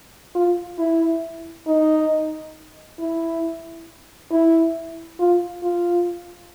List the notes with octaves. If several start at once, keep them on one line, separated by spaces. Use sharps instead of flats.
F4
E4
D#4
E4
E4
F4
F4